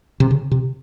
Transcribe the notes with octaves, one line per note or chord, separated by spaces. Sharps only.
C3
C#3
C3